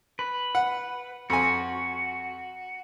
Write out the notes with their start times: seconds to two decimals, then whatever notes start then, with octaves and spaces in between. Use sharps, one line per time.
0.19 B4
0.55 F#5
1.30 F2 F#4 G#5